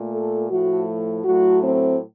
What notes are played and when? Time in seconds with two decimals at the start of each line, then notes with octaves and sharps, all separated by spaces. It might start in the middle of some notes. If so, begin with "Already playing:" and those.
Already playing: A#2 A3
0.12 A4
0.50 A2 F3 A3 F#4
1.25 A2 F#3 A3 F#4
1.64 C4